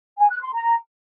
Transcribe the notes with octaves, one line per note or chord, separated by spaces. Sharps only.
G#5
F#6
C6
A#5